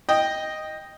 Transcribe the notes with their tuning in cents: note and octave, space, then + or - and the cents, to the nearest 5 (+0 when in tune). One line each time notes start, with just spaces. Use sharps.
D#5 +0 G5 +5